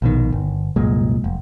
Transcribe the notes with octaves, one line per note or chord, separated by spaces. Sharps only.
A#1 B2 D#3
G1
C2 F#2 A#2 G#3
F1